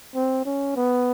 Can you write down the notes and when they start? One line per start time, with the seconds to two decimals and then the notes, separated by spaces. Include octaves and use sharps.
0.15 C4
0.45 C#4
0.76 B3